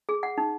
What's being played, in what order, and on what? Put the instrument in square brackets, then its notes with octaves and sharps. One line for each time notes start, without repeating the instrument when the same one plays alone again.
[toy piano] G#4
F#5
D#4